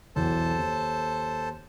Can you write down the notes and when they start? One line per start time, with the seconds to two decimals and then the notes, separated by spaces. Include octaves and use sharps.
0.16 B1 E2 E3 A4 C5 A5
0.58 D#2